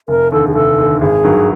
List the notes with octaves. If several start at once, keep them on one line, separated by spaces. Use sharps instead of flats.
F1 A#4
D#2 D3 A4
G#4
F1 A4
D#2 D3
G#1 G#4
G2 D#3 F#3